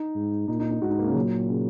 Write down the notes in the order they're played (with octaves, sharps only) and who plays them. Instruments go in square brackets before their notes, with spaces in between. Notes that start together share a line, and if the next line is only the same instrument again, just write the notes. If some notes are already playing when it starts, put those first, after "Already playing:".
Already playing: [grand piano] D#4
[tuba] G#2
[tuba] A#2 [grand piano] D#4
[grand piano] D#4
D#4
[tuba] G#2 [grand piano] F#4
[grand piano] D#4
A#3
C#3
[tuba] A#2 [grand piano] F#3
[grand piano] C#3